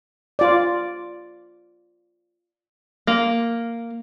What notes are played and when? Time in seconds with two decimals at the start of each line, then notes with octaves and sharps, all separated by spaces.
0.39 F4 D5
3.07 A#3